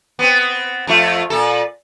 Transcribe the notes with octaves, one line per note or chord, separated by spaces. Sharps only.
B3 C4
F2 A3 F4
A#2 A4